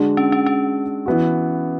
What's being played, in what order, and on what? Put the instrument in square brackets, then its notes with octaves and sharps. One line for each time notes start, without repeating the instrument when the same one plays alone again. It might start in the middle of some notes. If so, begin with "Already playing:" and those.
Already playing: [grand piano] D3 G#3 D4 F#4
[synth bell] C#4
C#4
C#4
[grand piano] E3 B3 F#4